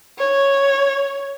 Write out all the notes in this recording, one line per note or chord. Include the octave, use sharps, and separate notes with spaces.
C#5